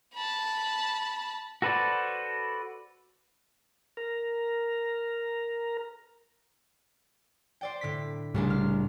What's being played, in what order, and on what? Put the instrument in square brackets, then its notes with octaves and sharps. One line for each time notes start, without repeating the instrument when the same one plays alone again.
[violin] A5 B5
[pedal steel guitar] F#4 A4 B4 C5 D5
[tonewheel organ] A#4 A#5
[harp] C5 D5 G5
A2 D3 B6
[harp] C2 C#3 D4 [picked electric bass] A2 G3
[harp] F6